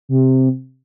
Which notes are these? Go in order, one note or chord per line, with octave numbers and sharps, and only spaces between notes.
C3